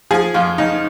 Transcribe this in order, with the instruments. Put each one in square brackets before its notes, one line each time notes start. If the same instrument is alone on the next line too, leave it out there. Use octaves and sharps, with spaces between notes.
[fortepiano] F3 G#4
F2 F4
C#3 D#4